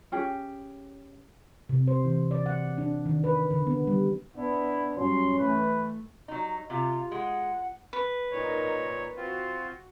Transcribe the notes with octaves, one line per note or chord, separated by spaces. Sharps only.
C#4 G4 G#4
C3
C5
E3
D5
F#5
D4
D#3
B4
D3
B3
G3
B3 D4 E4
F#2 F#3 G3 C#4 C6
E3 A3 B4
F#3 D#4
C3 F4
G#3 F#5
B4
A#2 D#4 A#4 C#5
C4 F4 F#4